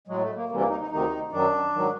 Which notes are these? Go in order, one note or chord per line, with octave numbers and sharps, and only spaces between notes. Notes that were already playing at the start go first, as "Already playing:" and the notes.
A2 F#3 G#3
A3
A#3
D2 C3 E3 G3 A#3
A#3
D#4
D#4
D2 C3 D#3 D#4
F#2 D#3 F#3 D4
G#2 D#3 F#3